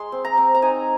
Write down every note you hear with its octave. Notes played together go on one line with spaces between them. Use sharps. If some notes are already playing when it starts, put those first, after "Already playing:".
Already playing: G#3 C6
C4
A#5
C4
A#5
D#4 G#5